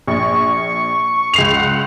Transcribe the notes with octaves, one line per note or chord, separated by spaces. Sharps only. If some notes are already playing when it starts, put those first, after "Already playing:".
A#1 C#6
C#2 C7 F7
F#5